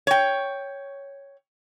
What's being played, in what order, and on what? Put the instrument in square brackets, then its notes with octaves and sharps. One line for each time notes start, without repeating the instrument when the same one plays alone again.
[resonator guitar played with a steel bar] C#5 G5